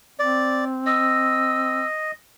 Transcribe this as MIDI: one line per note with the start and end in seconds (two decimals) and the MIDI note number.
0.19 1.85 60
0.19 0.65 74
0.86 2.12 75
0.86 1.86 88